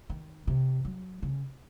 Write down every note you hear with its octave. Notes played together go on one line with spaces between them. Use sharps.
D#3
C3
F#3
C#3